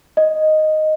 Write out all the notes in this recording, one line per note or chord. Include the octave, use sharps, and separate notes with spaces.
D#5